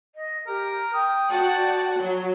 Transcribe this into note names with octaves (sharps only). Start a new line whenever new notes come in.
D#5
G4 A#4
G5 D#6
F#4 D5 F#5 A5
F#3